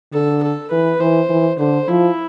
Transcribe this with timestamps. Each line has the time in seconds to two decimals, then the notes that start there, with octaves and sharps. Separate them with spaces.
0.13 D3 A4
0.43 A4
0.71 E3 B4
1.00 E3 C5
1.30 E3
1.59 D3 C5
1.88 F3 E4